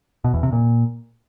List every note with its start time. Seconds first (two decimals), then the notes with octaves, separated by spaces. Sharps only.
0.24 B2
0.34 E2
0.43 C3
0.52 A#2